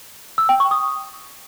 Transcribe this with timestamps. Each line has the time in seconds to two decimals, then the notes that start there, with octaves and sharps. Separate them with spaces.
0.38 E6
0.49 G5
0.60 C#6
0.71 D#6